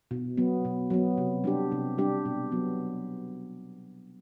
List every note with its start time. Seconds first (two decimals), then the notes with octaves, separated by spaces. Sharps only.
0.11 B2
0.37 F#3 B3
0.65 B2
0.90 F#3 B3
1.18 C3
1.44 G3 D4 G4
1.72 C3
1.98 G3 D4 G4
2.25 B2
2.51 F#3 B3